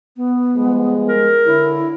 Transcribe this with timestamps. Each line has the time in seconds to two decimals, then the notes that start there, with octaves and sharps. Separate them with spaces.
0.17 B3
0.55 F3 G3 G#3
1.09 A#4
1.46 D3 E4 C#5